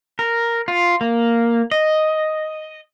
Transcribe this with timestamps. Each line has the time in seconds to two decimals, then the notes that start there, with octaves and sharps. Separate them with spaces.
0.19 A#4
0.68 F4
1.01 A#3
1.71 D#5